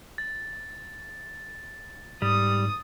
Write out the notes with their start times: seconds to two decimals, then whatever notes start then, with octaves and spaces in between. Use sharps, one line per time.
0.18 A6
2.22 G#2 G3 D#6